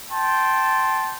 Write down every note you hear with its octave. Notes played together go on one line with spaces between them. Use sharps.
G5 A5 C6